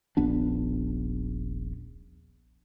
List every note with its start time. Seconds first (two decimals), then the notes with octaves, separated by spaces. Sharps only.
0.17 D#1 A#1 B3 D4